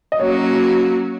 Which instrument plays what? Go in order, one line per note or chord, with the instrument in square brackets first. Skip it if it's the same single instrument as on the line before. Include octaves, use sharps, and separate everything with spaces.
[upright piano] D#5
[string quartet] F#3 A#3 C#4 F#4 [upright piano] C#5